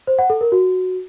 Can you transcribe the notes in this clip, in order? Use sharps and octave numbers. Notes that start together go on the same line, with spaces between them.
C5
F#5
A4
A#4
F#4